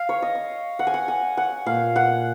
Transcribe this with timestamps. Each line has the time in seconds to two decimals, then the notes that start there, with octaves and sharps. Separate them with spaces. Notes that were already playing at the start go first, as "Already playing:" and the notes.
Already playing: F5
0.09 C#5
0.22 D#5
0.35 F5
0.79 F#5
0.87 G#5
0.94 F#5
1.08 G#5
1.37 F#5
1.66 A#2 F5
1.96 F#5